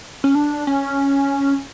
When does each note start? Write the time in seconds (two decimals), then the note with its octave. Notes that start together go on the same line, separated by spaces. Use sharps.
0.24 C#4
0.35 D4
0.67 C#4